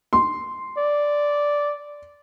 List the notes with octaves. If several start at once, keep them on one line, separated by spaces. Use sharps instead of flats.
C6
D5